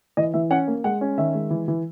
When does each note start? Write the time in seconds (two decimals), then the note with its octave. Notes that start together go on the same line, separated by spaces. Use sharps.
0.17 E3 D#5
0.34 E3 E5
0.50 C#4 F#5
0.67 A#3
0.84 G#3 F#5
1.01 C#4
1.17 D#3 E5
1.34 G#3
1.50 E3
1.68 E3